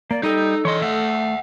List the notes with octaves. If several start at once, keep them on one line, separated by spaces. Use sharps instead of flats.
A#3 D5
G3 D#4 A4 D#5 G5
E3 C#5 D#5 C6
A3 E5 F#5